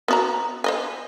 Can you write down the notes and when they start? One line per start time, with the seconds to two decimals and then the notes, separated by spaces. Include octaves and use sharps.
0.08 B3 F#4 A#5
0.64 C5 D#5 G#5